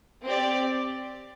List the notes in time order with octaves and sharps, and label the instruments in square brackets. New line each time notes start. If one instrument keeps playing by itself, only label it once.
[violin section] C4 G4 D5